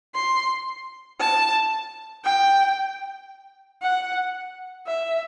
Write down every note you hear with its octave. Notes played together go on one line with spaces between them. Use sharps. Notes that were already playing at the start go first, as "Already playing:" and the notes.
C6
A5
G5
F#5
E5